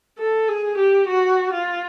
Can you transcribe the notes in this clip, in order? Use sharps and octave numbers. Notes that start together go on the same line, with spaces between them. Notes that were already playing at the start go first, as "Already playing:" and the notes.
A4
G#4
G4
F#4
F4